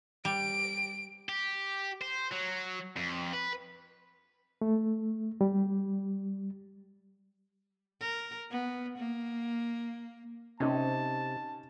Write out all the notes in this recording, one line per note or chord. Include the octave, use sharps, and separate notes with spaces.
G3 D7
G4
C5
F#3
F2
B4
A3
G3
A#4
B3
A#3
C3 C#4 D#4 A5